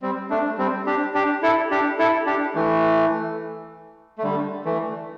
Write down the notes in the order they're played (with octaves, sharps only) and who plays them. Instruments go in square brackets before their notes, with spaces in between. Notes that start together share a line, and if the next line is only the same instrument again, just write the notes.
[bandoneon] G3 C4
A3 D4
G3 C4
D4 G4
D4 G4
E4 A4
D4 G4
E4 A4
D4 G4
E3 A3
A3
D3 G3
E3 A3